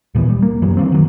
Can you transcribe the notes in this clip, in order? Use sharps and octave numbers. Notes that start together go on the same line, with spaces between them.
D#2 A#2 E3 B3
G3
A#3
F#2 E3 F#3 G3
E3 A#3 C4
D#3 F#3